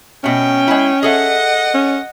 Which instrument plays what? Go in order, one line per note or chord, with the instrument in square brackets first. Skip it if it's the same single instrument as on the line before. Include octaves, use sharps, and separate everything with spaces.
[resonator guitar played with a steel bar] B2 A3 [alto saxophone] C#4 [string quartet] G5
[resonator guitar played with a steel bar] G#3 E4
[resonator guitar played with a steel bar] G#4 A4 E5 [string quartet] D#5 F#5
[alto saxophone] C#4